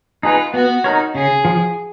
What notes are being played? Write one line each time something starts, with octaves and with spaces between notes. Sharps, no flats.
D#4 F4 G#4 B4
B3 F#4
D#4 A#4 C#5
C#3 G#4
F3